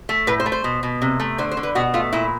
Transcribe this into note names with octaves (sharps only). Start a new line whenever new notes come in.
A3
A2 B4
C5
A3
C5
B2
B2
C3
A3
D3 C5
C5
D3
B4
B2 F#4
A3 F4
A#2 E4